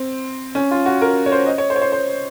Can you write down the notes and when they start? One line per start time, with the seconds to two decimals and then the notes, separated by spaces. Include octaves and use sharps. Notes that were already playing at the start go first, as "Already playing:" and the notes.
Already playing: C4
0.55 C#4
0.71 F4
0.86 F#4
1.01 A#4
1.26 C#5
1.32 C5
1.46 D#5
1.58 C#5
1.70 C5
1.76 C#5
1.82 C5
1.92 C5